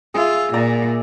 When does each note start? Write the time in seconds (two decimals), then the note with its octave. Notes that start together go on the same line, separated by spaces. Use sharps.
0.14 F4 G#4 E5
0.54 A#2 D5 A#5